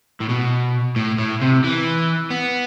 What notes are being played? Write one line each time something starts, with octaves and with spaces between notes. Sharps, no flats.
A2
B2
A2
A2
C3
E3
B3